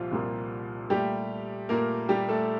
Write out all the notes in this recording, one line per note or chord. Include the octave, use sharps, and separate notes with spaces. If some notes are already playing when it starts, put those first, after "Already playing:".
Already playing: C2 A#2 F3 G3 F4
C2 A#2 G3 A#3
A#2 G3 A3 G4
A#2 A3 A#3 A#4
G3 G4
A3 A4